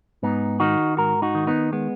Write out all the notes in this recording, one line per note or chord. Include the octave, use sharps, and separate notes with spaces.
G#2 B3 D#4
D#3 D#4 F#4
G#2 F#4 A#4
D#4 F#4
D#3
B3 D#4
G#3 B3